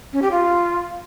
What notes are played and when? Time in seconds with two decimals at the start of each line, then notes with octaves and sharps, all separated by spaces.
0.13 C#4
0.22 G4
0.31 F4